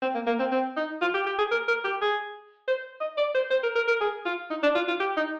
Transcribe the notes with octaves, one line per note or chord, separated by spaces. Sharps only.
C4
A#3
A#3
C4
C4
D#4
F4
G4
G4
G#4
A#4
A#4
G4
G#4
C5
D#5
D5
C5
C5
A#4
A#4
A#4
G#4
F4
D#4
D4
F4
F4
G4
D#4